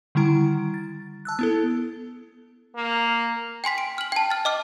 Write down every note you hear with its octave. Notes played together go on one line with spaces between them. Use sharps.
D3 D#3 G3 E4 A#5
A6
A5 E6 F#6
B3 E4 A4
A#3
G5 G#5 C6 B6
D7
F6 F#7
G5 A5
F6 A6
D#5 D6 F6